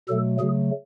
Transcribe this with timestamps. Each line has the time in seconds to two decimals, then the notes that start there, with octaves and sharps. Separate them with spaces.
0.08 B2 F#3 A3 A4
0.39 C#3 F#3 A3 G#4